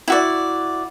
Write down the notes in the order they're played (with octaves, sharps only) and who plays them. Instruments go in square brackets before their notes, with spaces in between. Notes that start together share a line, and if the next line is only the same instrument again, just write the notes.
[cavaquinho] E4 F#4 D5